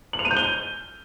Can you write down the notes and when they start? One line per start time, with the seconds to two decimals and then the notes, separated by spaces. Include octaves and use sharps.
0.13 F#7
0.19 F7
0.25 D#7
0.31 G6
0.36 G7